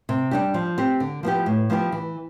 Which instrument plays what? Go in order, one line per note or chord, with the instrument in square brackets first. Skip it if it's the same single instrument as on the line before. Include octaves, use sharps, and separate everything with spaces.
[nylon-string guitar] C3
G3 D4 G4
F3
C4 G4
D3
F3 B3 E4 G4
A2
F3 B3 E4 G4
E3